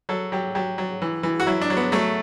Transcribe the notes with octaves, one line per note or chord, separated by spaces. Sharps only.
F#3 A4
F#3 G4
F#3 G4
F#3
E3
E3
F#4
F#3 E4
D4
F#3
B3
F#3 A3